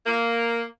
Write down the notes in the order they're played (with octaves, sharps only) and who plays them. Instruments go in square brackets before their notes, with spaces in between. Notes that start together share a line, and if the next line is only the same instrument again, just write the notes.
[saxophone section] A#3